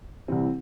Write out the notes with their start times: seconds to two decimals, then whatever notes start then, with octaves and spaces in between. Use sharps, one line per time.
0.28 C2 C3 E3 C4